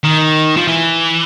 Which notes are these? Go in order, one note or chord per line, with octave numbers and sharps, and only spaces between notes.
D#3
F3
E3